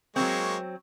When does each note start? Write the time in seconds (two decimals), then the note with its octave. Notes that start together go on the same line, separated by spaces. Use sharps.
0.16 F#3 G#3 A#3 C4 C#6